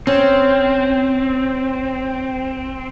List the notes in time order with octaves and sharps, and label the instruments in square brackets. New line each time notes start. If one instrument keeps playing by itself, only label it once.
[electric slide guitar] C4 [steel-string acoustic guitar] C#4